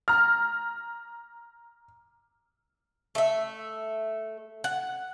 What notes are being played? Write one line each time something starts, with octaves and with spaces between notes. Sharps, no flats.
A#5 F6
A3 E5
F#5